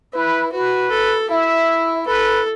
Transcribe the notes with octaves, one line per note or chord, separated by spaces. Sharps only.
E4 B4
F#4 B4
A4
E4 E5
A4 B4